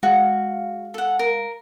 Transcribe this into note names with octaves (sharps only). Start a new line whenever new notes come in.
G#3 F#4 F5
A4 F#5
A#4